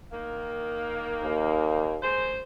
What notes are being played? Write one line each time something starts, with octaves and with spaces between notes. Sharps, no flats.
D#3 A#3
D#2
F#2 G#3 C5